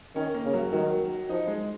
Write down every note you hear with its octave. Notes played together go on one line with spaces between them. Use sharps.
D#3 C#4
A#3
C#3
F#3
D#3 F#3
F3 D#4
G#3